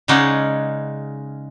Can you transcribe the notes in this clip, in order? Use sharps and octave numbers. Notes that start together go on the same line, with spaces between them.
C#3 G#3 C#4 D#4 D5 F#5